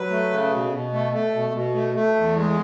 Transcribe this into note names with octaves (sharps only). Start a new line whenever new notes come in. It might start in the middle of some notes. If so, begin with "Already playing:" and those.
Already playing: F#3 B4
A3
C#3
B2
B2
A3
A3
B2
B2
A3
A3
E2
G#3